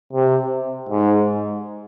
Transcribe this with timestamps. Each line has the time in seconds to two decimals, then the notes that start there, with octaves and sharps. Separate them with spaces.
0.13 C3
0.89 G#2